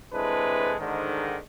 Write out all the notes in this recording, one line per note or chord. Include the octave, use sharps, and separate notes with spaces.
C3 E3 G#3 D4 A4 B4
G#2 D3 D#3